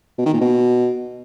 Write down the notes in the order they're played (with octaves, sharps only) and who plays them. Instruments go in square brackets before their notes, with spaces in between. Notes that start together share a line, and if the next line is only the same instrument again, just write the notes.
[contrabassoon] B2
D#3
A#2
B2